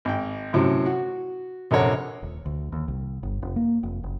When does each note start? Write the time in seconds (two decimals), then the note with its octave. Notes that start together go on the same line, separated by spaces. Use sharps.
0.05 G#1 G5
0.53 F#2 A2 C3 F#3
0.86 F#4
1.71 A#1 C3 A4 A#4 C#5 F#5
2.22 D#1
2.46 D2
2.72 D#2
2.88 C2
3.23 G1
3.42 F1
3.56 A#3
3.83 F1
4.03 F#1